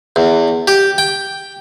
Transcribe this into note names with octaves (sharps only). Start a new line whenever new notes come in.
E2
G4
G5